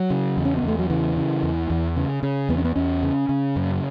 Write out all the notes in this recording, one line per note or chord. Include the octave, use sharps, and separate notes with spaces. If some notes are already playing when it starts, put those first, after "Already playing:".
Already playing: F#3
C#3
E2
C#4
B3
E2 A3
F#3
C#3 E3
C#3
E2
E2
C#3
C#3
E2 B3
C#4
B3
E2 C#4
C#3
C#3
F#2